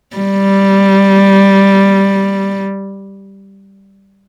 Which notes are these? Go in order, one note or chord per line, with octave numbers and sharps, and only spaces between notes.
G3